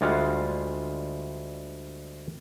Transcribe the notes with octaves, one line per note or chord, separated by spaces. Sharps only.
D2 G3 G#3 F4 F5 F#5